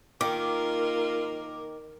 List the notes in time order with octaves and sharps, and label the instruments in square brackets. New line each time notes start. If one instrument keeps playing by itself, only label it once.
[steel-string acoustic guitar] D#3 [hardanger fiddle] A#3 A#4 [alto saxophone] F4 [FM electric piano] D6